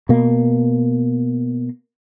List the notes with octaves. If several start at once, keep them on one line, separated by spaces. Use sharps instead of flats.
B2 A#3